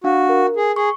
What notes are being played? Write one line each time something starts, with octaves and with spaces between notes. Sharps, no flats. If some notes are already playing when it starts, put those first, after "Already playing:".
D4 F#4 F5
A#4
G#4
G#4 C#6